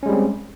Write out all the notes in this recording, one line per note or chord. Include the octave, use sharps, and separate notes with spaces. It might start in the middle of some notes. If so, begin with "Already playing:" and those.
G3 G#3 C4 C#4